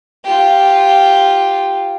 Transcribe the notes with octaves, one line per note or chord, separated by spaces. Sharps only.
F4 G4